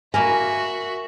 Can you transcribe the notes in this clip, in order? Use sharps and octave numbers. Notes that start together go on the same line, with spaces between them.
A#3 E4 F#4 A#4 E5 G#5